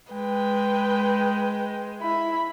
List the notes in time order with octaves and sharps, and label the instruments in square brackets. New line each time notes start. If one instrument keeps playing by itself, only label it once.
[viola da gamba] G#3 [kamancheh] B4 G5
[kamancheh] E4 B5